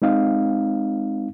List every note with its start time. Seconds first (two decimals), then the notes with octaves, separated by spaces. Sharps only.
0.02 G#3 C4 D#4 F5